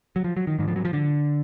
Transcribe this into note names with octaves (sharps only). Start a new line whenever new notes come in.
F#3
F3
F#3
D#3
G#2 D#3
F3
F#3
F3
D3